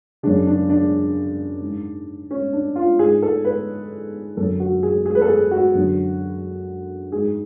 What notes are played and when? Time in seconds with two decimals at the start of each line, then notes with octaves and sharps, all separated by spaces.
0.23 F#2 C#3 D4
0.47 D4
0.69 D4
1.61 G#2
2.31 C#4
2.53 D4
2.76 F4
2.99 G#2 G#4
3.22 A4
3.45 B4
4.37 F#2 D3 A4
4.60 F#4
4.83 G#4
5.06 G#4
5.15 B4
5.21 A4
5.28 G#4
5.51 F#4
5.75 F#2 D3
7.12 G#2 G#4